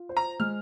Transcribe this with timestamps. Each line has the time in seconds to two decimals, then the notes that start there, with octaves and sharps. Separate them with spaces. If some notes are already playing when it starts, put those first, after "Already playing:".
Already playing: F4
0.09 C5
0.17 A#5
0.40 G#3 F6